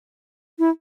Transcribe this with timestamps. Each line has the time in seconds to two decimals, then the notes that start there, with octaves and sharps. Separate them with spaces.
0.59 E4